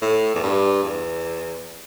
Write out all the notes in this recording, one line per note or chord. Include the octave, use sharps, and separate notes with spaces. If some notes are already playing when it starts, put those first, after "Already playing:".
A2
E2
G2
E2